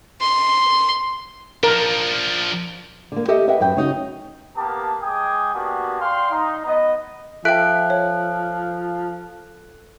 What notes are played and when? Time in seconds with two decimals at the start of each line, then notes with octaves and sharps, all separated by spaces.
0.21 C6
1.63 F3 D4 A#4
3.12 D3 A#3
3.28 G4 A4 D#5 E5
3.47 B4 D#5 E5 F#5 G5
3.60 F#2 B4 G5
3.77 C#3 D#4 F#4
4.57 A#3 B3 G4 A#4 A5
5.02 G#3 G5 G#5 D6 D#6
5.54 A#3 B3 D4 F#4 G4 G#5
6.01 D5 F5 G5 C6
6.32 D#4
6.66 B3 D#5
7.45 F3 A4 E5 G5 F#6 D7
7.90 C#5